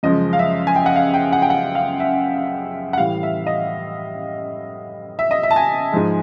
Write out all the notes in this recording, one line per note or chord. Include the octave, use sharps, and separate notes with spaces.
F#2 C#3 F3 G#3 D#5
F5
E5
G#5
G5
F#5
F5
G5
F#5
G5
F#5
F5
E5
F#5
A2 E3 G3 F5
E5
D#5
E5
D#5
E5
A5
G#5
G#2 F3 G#3